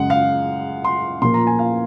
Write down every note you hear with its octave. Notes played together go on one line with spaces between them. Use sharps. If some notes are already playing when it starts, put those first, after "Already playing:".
Already playing: F#2 C#3 G#3 F#5
F5
C6
A#2 F3 A#3 C6
A#5
G#5
F5